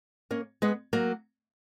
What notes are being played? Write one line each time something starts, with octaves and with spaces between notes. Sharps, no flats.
A#3 C#4
G#3 B3
F#3 A#3